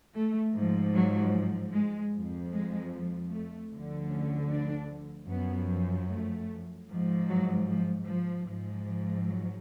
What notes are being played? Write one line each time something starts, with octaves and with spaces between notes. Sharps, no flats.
A3
G#2 F3
F#3
G#3
F2 F3
G#3
A3
D2 D3 F3
C#4
D4
F#2 F3 B3
A3
G#2 F3
F#3
F3
F3
G#2 F3
F#3